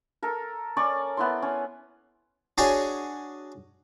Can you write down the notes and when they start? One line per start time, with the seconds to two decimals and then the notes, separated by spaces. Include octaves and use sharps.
0.23 A4 A#4
0.77 C#4 D5 C#6
1.17 B3 E4 C6
1.42 C#4
2.58 D4 F#4 G#4 C#5 F#5 G#5